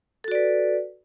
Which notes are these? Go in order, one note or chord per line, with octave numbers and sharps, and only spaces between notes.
F#4 A4 B4 D5